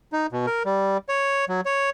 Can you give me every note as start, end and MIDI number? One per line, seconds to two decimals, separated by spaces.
0.12 0.27 63
0.32 0.46 47
0.46 0.63 70
0.66 0.97 55
1.09 1.45 73
1.49 1.61 54
1.65 1.90 73